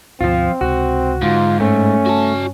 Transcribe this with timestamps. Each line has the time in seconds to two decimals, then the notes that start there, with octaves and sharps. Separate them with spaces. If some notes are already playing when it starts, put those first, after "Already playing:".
0.21 D2 G#2 B2 F3 C4 F4
0.61 C#2 C3 G#3 F#4
1.22 G#2 D3 C#4 F4
1.60 G2 A3 C#4
2.06 F#4 A5